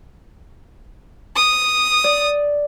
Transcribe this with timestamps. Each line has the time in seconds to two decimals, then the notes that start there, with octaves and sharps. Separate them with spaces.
1.35 D#6
2.04 D5